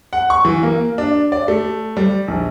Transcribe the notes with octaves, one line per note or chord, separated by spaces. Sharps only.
F#5
C#6
E3
A#3
D4
D5
A3
G3
A#1